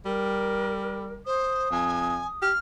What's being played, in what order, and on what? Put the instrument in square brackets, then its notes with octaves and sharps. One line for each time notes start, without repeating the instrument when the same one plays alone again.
[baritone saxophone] G3 [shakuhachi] A#4
[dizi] C5 [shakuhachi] D#6
[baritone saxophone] F2 [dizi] G#5
[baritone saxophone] G4 [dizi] F6